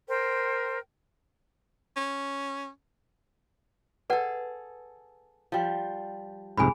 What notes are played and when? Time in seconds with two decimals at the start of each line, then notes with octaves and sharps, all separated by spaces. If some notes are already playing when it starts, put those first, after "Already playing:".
0.09 A#4 C5 G5
1.97 C#4
4.10 G#4 A4 B4 D5 F#5
5.52 F3 G3
6.58 C2 F2 G#2 G#4 G#5 B5